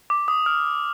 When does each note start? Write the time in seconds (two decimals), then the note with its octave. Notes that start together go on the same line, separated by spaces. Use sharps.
0.10 D6
0.28 D#6
0.46 F6